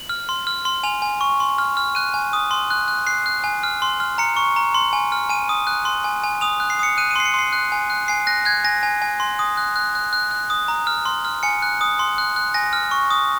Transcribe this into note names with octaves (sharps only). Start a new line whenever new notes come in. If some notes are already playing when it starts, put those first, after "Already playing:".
Already playing: F#7
F6
C6
F6
C6
G#5 F7
G#5
C#6
C6
F6
F6
F#6 D#7
G#5
D#6
C6
F#6
F#6
F#6 C7
F#6
G#5
F6
C6
F6
A#5 C#7
C#6
A#5
C6
G#5
F6
G#5 D#7
D#6
F#6
C6
G#5
G#5
D#6 F7
F#6
C7
D#6 C#7
F#6 D#7
D#7
C6 C7
C#7
C6 C7
F#6
G#5
F#6
G#5 C7
F#6 A#6
F#6 G#6
G#5 A#6
G#5
G#5
C6
D#6
F#6
F#6
F#6
F#6
F#6
D#6
A#5
F6
C6
F6
G#5 C#7
F#6
D#6
C6
F#6
F#6
G#5 A#6
F6
C#6
D#6